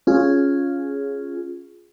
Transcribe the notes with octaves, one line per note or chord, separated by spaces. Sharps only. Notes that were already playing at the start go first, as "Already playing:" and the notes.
C#4 F4 G#4